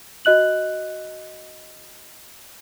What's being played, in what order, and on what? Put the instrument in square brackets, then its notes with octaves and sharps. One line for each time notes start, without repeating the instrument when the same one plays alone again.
[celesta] F#4 D#5 F#6 F#7